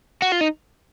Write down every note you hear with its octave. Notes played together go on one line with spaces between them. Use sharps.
F#4
F4
D#4